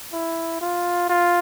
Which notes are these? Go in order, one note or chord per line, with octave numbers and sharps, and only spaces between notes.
E4
F4
F4